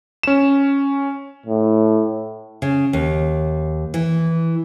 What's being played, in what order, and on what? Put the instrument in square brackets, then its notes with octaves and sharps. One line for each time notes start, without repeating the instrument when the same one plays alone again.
[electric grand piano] C#4 E7
[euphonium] A2
[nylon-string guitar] C#3
D#2
E3